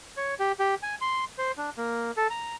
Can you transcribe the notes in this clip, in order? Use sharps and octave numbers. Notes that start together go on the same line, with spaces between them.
C#5
G4
G4
G#5
C6
C5
D4
A#3
A4
A#5